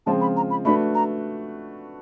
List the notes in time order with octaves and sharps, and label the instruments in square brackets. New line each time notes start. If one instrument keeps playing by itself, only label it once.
[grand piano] C#3 F3 G#3 C4 F4 [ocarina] A5
[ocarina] B5
A#5
B5
[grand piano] A3 D4 F#4 B4 [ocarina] B5
[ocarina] A#5